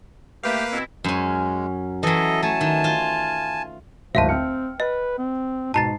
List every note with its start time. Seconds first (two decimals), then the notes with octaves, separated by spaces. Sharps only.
0.43 G2 A3 A#3 G4 B4 F5
0.72 B2 C4 E4
1.04 F#2 G#3 C#4
2.03 E3 F#3 A4 D#5
2.43 A3 G#5 A5
2.61 D#3
2.84 F4
4.15 D1 G#1 C5 E5 F5 A5
4.29 C4 G5 F6 C#7
4.80 B4 D#5
5.18 C4
5.74 G#2 B2 A5 A#5 A6 C7